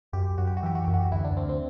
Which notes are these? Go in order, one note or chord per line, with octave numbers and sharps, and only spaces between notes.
F#2 G4
F#2 F#4
G4
F#4
E3 G4
F#4
F#2 G4
F#4
D2 E4
D4
D2 C4
C4